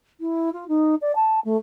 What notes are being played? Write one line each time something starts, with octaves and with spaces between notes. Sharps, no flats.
E4
F4
D#4
D5
A5
A3